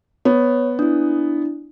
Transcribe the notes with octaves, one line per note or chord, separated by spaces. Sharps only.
B3 C#5
D4 E4